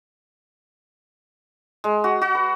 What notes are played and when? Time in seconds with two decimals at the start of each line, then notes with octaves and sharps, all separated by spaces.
1.84 G#3
2.04 F#4
2.21 F#4
2.35 B4